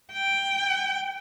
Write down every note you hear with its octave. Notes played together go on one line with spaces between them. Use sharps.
G5